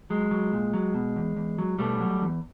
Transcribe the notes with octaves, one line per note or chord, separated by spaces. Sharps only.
F#3 G#3
F#3
A#2
F#3
B2
E2
E2
F#3
B2 G3 A3
F#3
E2